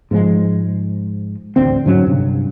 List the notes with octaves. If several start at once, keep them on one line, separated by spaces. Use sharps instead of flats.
G#2 F3 G#3
A1 D2 D3 C4
G#2 D3 F#3 C#4
G2 C3